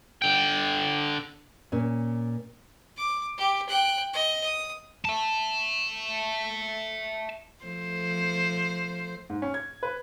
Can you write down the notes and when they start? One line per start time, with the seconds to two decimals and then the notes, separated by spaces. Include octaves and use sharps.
0.22 D3 G5
1.72 A#2 C#4
2.97 D6
3.38 G4
3.69 G5 F#6
4.13 D#5
4.44 D#6
5.05 E5 A5
7.64 F3 A3 C5
9.30 G#2
9.42 C#4
9.54 G#6
9.83 B4